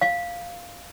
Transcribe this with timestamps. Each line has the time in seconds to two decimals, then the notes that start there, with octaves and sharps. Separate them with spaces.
0.01 F5